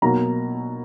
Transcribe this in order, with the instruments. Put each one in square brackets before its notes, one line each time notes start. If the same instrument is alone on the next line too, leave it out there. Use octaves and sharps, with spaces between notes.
[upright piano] B2 F#3 A#3 A#5